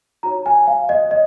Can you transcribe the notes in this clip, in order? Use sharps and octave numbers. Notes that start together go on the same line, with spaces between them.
D#4 F#4 C#5 A#5
G#5
F5
D#5
C#5 D#5